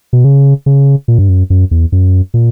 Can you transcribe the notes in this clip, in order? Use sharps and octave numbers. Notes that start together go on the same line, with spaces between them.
B2
C#3
C#3
A#2
G2
F#2
F#2
E2
F#2
A#2